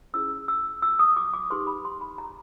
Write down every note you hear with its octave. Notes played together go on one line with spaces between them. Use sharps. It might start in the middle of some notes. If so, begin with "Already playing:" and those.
C#4 E4 G#4 C5 E6
E6
E6
D#6
D6
D6
D#4 G4 B4 C6
B5
C6
B5
A#5